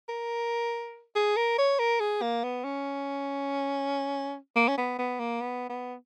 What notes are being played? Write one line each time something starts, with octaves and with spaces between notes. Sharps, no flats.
A#4
G#4
A#4
C#5
A#4
G#4
A#3
B3
C#4
A#3
C#4
B3
B3
A#3
B3
B3